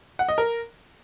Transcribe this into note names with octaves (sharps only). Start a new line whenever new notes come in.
F#5
D#5
A#4